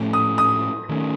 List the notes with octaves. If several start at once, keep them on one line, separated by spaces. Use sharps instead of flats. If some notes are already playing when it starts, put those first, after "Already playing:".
Already playing: A2 F3 A3 C#4
D#6
D#6
D#3 A3 C#4